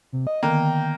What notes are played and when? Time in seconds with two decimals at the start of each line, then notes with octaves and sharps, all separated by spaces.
0.13 C3
0.27 D#5
0.43 D3 D#3 A#3 B3 G5